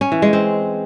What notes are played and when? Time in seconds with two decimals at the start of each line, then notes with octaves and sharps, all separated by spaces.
0.01 C#4
0.12 E3
0.22 G#3
0.33 C4